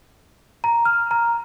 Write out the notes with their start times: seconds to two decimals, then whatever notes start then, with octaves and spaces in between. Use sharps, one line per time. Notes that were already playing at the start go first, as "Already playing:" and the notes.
0.64 A#5
0.85 F6
1.11 A#5